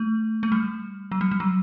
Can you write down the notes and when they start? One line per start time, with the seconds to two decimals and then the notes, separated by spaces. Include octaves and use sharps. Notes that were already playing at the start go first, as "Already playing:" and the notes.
Already playing: A3
0.43 A3
0.52 G3
1.12 F#3
1.21 G3
1.31 G3
1.40 F#3